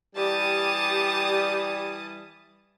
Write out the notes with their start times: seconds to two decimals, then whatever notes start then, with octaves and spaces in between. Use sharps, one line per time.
0.16 E3 G3 G4 A5 D#6